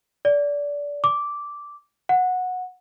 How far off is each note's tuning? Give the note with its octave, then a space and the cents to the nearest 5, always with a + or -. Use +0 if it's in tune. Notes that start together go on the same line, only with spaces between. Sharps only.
D5 -25
D6 -5
F#5 -15